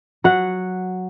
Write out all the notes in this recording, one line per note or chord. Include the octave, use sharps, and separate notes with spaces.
F#3 F#5